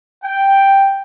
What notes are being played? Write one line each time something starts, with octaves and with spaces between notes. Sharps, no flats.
G5